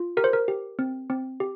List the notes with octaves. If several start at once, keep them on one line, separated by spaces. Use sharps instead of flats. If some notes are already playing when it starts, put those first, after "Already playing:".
Already playing: F4
G4 A#4
C5
A#4
G4
C4
C4
G4